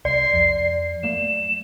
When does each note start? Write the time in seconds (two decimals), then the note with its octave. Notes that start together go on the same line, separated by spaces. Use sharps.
0.05 C2 D5 C7
0.34 F2
1.03 F#3 A3 A#3 E7